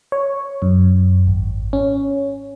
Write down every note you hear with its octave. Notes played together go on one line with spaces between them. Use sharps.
C#5
F#2
G#1
C#4